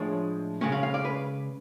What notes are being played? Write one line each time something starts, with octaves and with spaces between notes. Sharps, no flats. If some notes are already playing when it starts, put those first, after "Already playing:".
Already playing: A2 F3 G#3 D4 C#5
C#3 G#3 C#4
F5
F5
D5
B4